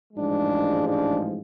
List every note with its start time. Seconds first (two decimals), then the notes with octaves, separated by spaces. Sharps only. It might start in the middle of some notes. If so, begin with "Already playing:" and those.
0.13 A1 G#2 F3 G#3 D4
0.84 D4